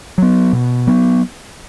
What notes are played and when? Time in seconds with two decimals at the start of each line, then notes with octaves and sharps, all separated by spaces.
0.18 F#3 B3
0.53 B2
0.87 F#3 B3